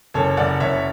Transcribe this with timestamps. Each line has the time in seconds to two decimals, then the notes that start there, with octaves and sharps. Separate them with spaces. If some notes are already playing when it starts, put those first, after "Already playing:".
0.14 F#1 A4 C#5
0.37 F#1 D5 F#5
0.60 F#1 C#5 E5